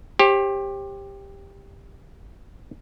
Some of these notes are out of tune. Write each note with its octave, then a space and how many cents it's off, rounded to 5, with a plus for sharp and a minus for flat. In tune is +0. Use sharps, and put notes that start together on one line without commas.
G4 +10 C5 +45